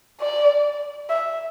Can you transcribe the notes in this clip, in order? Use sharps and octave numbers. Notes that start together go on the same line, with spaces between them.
D5
E5